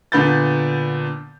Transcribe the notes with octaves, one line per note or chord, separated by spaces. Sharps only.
A#2 D3 B3 B5 G6 A6